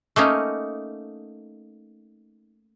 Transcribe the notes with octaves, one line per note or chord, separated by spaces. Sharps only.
A3 A#3 C#4 D#4